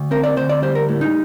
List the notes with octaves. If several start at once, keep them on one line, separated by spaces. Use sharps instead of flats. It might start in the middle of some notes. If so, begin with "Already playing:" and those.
Already playing: D2
C4 A#4
D5
D2 C5
D5
G3 C5
A#4
A2
D#4